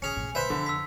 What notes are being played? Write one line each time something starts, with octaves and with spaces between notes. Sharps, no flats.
A1 C#4 G#4 C#7 F7
B1 A2
B4 C5 E5 B5
F2 D3
E6 B6